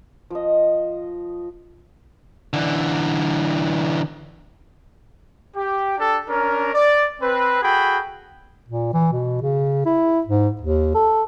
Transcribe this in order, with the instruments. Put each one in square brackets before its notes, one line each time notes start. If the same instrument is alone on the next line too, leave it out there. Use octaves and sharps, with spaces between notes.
[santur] F3 D#5
[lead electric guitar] D3 E3
[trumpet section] G4
D4 G4 A4 A5
C#4 D4 A#4
D5
C4 B4
F#4 G#4 A4 G5 B5
[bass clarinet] A#2
E3
B2
C#3
E4
G#2
D#2
A4